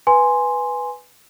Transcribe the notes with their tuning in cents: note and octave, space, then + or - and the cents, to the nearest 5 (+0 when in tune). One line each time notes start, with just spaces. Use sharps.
B4 +0 G#5 +0 C6 +0